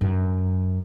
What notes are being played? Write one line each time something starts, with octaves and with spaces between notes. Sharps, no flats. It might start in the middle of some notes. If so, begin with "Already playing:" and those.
F#2